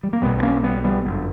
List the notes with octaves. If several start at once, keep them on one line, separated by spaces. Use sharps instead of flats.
G3
A#3
B1 B2 G3 B3
B3
A#3 C#4
G3 B3
G3 B3
G1 F#2 D3